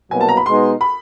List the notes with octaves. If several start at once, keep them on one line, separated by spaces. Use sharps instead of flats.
C2 B2 F#3 A#3 G#5
A5
A#5
B5
B2 G#3 B3 D#4 C6
B5